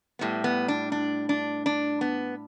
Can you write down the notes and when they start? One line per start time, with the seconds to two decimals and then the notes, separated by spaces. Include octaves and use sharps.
0.19 A2 G3 B3
0.44 B3
0.68 D4
0.92 D4
1.29 D4
1.66 D4
2.01 B3